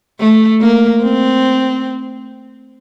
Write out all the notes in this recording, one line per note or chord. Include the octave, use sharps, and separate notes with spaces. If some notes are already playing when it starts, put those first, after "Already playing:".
A3
A#3
C4